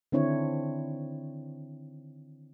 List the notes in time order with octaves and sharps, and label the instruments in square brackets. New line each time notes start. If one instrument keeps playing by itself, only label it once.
[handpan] D3 D#3 C4 D4 E4 C#5